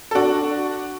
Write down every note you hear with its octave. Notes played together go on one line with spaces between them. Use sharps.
A4
D4 F#4